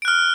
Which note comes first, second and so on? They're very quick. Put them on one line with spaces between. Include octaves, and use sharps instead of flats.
D7 F#6 F6